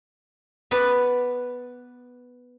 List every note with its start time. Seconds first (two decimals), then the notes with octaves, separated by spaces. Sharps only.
0.71 B3 B4 D5